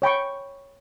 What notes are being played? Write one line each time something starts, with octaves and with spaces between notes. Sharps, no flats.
C#5 G5 B5 C#6